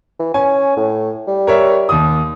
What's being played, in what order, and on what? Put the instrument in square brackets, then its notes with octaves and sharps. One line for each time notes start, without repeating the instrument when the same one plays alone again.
[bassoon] E3
[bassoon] C#4 [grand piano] G#5
[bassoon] A2
G3
[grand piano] A#4 C#5 E5
D#2 D#6